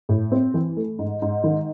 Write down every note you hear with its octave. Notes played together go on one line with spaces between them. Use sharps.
A2
C4
E3
A3
G#2
G#2
D#3